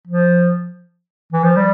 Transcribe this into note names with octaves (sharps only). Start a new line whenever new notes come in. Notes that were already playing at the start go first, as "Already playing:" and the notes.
F3
E3
F3
G3